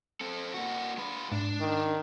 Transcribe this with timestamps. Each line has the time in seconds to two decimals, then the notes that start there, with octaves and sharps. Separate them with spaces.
0.21 C4 A4
0.54 A#3 F#4
0.98 G#3 B4
1.32 G#2 D4
1.60 D#3